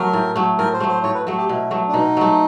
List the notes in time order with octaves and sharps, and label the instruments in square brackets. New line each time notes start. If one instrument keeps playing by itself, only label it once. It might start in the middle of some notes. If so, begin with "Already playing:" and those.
Already playing: [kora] F#3 A3 [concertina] A#4
[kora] A2
F#3 A3
[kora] A2 [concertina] A#4
[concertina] C5
[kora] F#3 A3
[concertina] C5
[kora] A2 [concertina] C#5
[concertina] B4
[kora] F#3 A3 [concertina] A4
[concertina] G4
[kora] B2 [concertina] E4
[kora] F#3 A3
[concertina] D4
[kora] B2 [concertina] D#4
[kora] F#3 A3